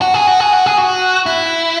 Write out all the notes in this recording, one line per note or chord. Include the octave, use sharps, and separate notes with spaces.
F#4
G#4
F#4
G#4
F#4
G#4
F#4
E4